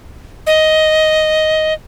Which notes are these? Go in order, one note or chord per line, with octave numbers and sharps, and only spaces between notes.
D#5